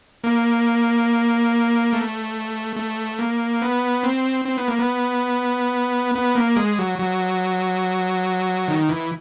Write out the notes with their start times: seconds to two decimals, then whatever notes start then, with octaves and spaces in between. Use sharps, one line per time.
0.24 A#3
1.93 A3
2.76 A3
3.19 A#3
3.62 B3
4.03 C4
4.45 C4
4.57 B3
4.68 A#3
4.79 B3
6.15 B3
6.35 A#3
6.56 G#3
6.79 F#3
6.99 F#3
8.68 D#3
8.89 E3